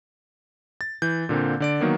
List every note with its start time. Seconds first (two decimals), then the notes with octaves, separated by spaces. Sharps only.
0.81 A6
1.02 E3 G6
1.29 A#2 D3 A#3 C4
1.60 D3 D5 D7
1.81 D#3 F#3 A#3 B3